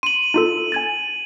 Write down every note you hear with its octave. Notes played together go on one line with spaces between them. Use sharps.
C6 D#7 F#7
D#4 F4 A4
G#5 G#6 A6